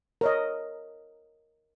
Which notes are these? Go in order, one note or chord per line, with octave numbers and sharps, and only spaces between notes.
A#4 C#5 D#5